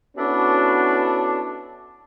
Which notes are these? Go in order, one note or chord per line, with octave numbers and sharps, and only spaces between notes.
B3 C#4 D4 E4 F#4 A4